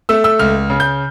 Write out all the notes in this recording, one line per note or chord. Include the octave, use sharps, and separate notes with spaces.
A3 E6
E6
C#2 F6
C#3
G6